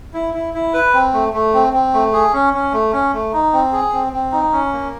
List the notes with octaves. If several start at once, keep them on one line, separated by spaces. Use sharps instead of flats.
E4
E4
E4
B4
C4
A3
A3
C4
C4
A3
G#4
C#4
C#4
A3
C#4
A3
D#4
C4
G#4
C4
C4
D#4
C#4
A#3